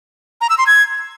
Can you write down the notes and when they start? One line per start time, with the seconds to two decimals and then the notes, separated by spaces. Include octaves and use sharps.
0.41 A#5
0.50 E6
0.58 C6
0.67 G#6